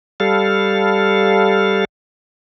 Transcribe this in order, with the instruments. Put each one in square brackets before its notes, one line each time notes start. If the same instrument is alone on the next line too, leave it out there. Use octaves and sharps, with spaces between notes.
[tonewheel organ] G3 A4 F5